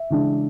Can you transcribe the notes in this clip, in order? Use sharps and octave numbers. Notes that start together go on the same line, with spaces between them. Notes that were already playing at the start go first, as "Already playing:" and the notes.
Already playing: E5
C#3 E3 G#3 D4